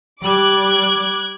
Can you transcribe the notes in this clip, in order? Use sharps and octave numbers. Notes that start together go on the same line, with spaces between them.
G3 D6 F#6 G#6